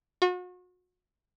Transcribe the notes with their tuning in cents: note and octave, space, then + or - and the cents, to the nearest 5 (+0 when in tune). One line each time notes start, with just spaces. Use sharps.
F#4 -40